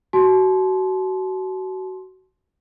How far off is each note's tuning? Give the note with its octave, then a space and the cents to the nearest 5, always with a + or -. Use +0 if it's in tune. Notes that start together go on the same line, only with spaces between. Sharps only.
F#4 +25 A5 -35 C6 +10